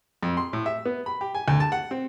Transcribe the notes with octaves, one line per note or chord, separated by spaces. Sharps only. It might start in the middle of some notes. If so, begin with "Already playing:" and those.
F2
C6
A2
E5
B3
B5
G4
G#5
D2
A5
F#5
C4